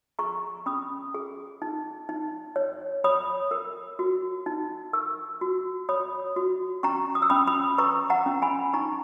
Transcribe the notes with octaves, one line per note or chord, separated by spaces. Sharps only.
G#4 A#5 C#6
C#4 B5 D#6
G#4
D#4
D#4
C#5
C#5 B5 D#6
A#4
F#4
D#4
A#4 C#6 E6
F#4
C#5 B5 D#6
F#4
C#4 A#5 C#6
D#6
E6
C#4 B5 D#6
B5 D#6
B4 A#5 C#6
F#5 A#5
C#4
G#5 B5
D#4 A#5 C#6